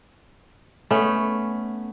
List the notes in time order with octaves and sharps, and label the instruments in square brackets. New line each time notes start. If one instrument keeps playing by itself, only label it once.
[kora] A3 B3 C#4